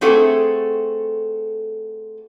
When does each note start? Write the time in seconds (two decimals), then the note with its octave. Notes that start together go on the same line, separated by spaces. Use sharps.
0.01 A3 C4 F#4 G#4 A4